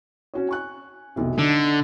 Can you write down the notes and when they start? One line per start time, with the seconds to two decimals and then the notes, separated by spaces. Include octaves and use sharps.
0.34 C#4 F#4 C#5
0.49 G#5 C#6 F#6
1.16 F1 B1 C3
1.39 D3 D#4